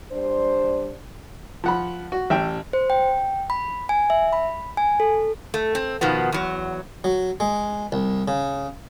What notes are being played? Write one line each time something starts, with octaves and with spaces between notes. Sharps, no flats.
G3 D4 C5
F3 F#5 B5
F#4
A1 E5 G5
C5
G5
B5
G#5
E5
B5
G#5
A4
A3
C4
B2 D#3 F3 B3
E2 F#3
F#3
G#3
C2
C#3